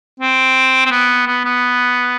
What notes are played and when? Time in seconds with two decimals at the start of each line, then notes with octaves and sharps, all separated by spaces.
0.20 C4
0.86 C4
0.91 B3
1.27 B3
1.45 B3